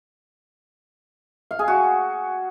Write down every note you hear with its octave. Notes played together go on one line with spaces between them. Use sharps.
F5
G#4
F#4